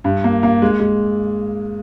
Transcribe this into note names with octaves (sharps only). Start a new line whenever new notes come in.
G2
A#3
A#3
G#3
G#3